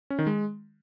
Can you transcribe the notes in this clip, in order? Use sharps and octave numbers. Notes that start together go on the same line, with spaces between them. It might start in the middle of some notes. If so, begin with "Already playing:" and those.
C#4
D#3
G#3